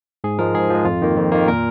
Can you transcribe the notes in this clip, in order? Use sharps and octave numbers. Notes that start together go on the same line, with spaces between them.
G#2 G#4
F3 G#3 A#4
G#2 G#4
F3 G#3
F2 F4
D#3 A#3
F2
D#3 A#3
A#2 A#4